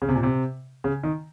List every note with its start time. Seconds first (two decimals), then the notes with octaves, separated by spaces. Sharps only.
0.02 C#3
0.09 C3
0.16 A#2
0.23 C3
0.84 C#3
1.03 D#3